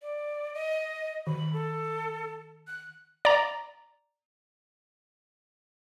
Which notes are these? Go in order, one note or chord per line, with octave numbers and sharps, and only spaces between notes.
D5
D#5
D#3 B5
A4
F#6
D5 A#5